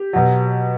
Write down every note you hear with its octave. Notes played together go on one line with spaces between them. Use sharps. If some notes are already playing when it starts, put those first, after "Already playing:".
Already playing: G4
B2 F#3